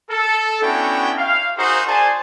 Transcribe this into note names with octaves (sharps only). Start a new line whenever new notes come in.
A4
B3 C#4 D4 E4 F#4 G5
F5
D#4 F#4 G#4 A#4 C5
G#4 C5 D5 G#5 A5